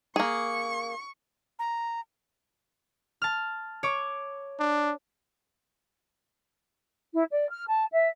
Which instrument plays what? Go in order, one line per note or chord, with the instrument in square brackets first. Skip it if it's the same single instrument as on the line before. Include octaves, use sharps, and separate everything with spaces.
[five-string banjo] A#3 G#4 [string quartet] C#6
[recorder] A#5
[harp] A5 F6
C#5 D6
[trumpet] D4
[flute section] E4
D5
F6
A5
E5